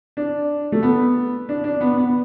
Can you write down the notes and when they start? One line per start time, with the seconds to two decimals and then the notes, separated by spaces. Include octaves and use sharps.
0.17 D4
0.72 A3
0.83 B3
1.49 D4
1.64 D4
1.81 B3
1.98 B3